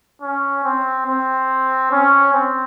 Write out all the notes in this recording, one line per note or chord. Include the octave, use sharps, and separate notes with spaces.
C#4
C4
C4
C#4
C4